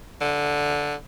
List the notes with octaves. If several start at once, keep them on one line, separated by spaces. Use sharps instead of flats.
D3